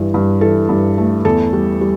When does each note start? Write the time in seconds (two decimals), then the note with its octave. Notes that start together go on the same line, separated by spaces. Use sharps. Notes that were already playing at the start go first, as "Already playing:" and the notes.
Already playing: G2 E3
0.14 G2
0.41 E3 A4
0.69 G2
0.98 A3
1.25 E2 A4
1.53 G3
1.81 G3